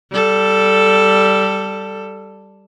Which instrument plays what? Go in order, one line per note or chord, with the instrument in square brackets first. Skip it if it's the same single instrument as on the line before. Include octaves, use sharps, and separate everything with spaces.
[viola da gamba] G3 A4